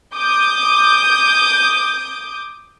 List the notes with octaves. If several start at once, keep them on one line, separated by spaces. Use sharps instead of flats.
D6 D#6 G6